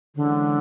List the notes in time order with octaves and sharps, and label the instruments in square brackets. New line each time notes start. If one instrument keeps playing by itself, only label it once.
[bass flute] D3 [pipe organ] E3 G#3 C#4